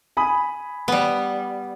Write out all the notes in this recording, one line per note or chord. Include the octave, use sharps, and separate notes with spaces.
G#5 B5 D#6
G3 B3